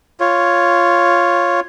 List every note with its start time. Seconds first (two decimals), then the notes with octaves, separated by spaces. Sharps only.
0.20 F4 C#5